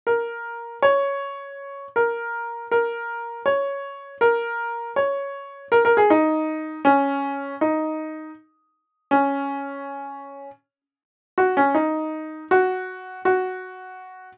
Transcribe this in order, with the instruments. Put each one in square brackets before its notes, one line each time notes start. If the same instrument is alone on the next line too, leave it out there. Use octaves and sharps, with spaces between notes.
[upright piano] A#4
C#5
A#4
A#4
C#5
A#4
C#5
A#4
A#4
G#4
D#4
C#4
D#4
C#4
F#4
C#4
D#4
F#4
F#4